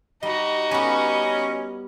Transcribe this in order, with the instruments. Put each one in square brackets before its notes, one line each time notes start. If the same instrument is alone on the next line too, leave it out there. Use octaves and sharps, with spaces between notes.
[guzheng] G3 [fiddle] D#4 F#4 [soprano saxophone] D#5
[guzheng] G3 B3 [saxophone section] C#4